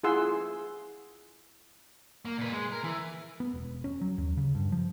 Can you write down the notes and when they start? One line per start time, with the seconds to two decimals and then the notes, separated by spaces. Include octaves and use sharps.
0.04 E4 F4 G#4 F#5 C6 E6
2.25 A#3
2.38 A#2 B4
2.52 G#3
2.72 A#4
2.84 E3
3.40 B3
3.54 E1
3.84 C#4
4.01 F#3
4.18 D#2
4.37 C#3
4.55 G2
4.72 F3